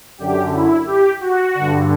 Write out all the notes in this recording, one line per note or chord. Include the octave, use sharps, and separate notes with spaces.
F#2 D3 G4
E4
G4
F#4
G2 D3